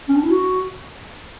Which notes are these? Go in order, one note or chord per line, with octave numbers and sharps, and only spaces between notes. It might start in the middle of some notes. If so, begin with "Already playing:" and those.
C#4
D4
E4
F#4